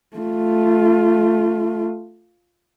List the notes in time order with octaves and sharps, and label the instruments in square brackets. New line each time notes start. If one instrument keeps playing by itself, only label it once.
[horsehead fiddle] A3 F4